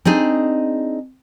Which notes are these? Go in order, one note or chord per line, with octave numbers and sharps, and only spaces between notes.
C4 D4 D#4 G#4